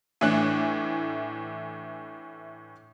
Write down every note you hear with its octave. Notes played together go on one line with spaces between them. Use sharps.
A2 E3 A3 D4 F#6